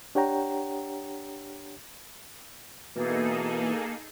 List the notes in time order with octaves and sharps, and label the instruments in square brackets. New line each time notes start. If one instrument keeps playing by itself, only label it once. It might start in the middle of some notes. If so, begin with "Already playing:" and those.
[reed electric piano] D4 G4 C#5 F#5 G5 A#5
[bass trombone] B2 [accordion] E3 [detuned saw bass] A#3 [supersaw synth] D#4 G#4 A4